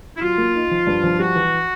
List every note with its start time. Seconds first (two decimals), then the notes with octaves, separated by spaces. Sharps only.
0.17 E4
0.21 F#3 F4
0.38 A#3
0.55 D#4
0.71 F3
0.87 G2
1.03 F3
1.20 G3 F#4
1.35 E3